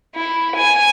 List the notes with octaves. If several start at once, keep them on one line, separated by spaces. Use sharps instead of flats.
E4
G#5